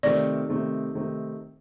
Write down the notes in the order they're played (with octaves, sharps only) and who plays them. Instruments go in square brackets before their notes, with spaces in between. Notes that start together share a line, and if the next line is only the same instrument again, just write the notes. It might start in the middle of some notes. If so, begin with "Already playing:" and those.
[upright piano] C3 D#3 A3 C4 D#4 [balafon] D5
[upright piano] C3 D#3 A3 C4 D#4
C3 D#3 A3 C4 D#4